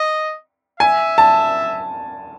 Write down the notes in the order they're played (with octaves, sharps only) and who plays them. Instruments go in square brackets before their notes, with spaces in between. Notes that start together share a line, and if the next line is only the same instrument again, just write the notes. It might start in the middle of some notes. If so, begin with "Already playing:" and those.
Already playing: [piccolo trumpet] D#5
[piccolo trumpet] E5 [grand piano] G#5
[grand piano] A5